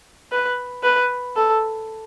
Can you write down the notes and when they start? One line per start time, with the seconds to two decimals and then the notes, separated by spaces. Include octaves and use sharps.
0.32 B4
0.83 B4
1.36 A4